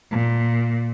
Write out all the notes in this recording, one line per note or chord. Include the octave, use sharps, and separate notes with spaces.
A#2